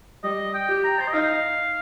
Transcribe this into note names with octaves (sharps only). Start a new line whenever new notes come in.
G3 D#5
G5
G4
A#5
C5
D#5
D#4 F5